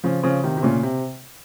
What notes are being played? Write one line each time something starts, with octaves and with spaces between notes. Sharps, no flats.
C#3 F3
C#3 F3
C3 D#3
C3
A#2 C#3
C3